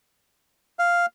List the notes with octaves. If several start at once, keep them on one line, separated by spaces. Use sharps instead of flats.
F5